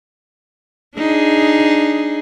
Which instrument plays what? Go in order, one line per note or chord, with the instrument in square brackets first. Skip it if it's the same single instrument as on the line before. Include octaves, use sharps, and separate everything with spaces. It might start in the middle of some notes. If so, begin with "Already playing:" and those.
[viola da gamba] D4 D#4 G#4